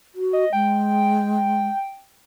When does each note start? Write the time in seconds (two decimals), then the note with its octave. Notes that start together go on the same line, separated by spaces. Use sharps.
0.15 F#4
0.33 D#5
0.53 G#3 G5